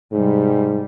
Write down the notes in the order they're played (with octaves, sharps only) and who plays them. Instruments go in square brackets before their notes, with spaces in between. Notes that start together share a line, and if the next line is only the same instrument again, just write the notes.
[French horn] G#2 [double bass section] C3 G3